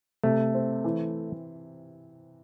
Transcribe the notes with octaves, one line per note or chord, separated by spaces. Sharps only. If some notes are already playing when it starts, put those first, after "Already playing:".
C3 A3
C4
E3